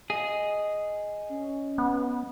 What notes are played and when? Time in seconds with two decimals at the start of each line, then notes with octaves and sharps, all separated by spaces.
0.10 G#4 D#5
1.29 C#4
1.78 B3